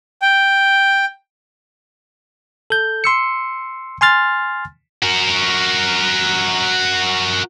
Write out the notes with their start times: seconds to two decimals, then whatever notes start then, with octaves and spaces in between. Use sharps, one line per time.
0.22 G5
2.70 A4 G6
3.04 C6 E6 C#7
4.01 G#5 C6 F6 A6
5.03 F#4 A#4